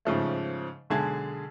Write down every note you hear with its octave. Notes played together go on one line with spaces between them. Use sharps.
G#2 C#3 F3 A3
B1 D3 G#3 G#4 A5 G#6